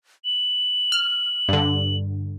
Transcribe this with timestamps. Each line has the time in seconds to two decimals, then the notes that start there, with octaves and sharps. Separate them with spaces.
0.25 F#7
0.92 F6
1.49 G2 D3